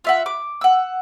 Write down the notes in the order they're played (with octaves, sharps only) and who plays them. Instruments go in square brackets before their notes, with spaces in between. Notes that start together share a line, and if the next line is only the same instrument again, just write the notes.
[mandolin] F4 E5 F#5
D6
F#5 E6